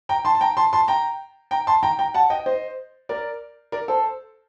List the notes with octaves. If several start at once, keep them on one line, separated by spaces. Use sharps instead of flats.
G5 A#5
A5 C6
A5
G5 A#5
A5 C6
A5 C6
G5 A#5
G5 A#5
A5 C6
G5 A#5
G5 A#5
F#5 A5
D#5 G5
C5 D#5
A#4 D5
A#4 D5
A4 C5